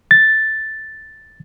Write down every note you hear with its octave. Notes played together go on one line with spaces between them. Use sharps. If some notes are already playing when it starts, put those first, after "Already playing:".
A6